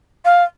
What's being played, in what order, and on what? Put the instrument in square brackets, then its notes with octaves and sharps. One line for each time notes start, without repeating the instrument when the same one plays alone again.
[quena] F5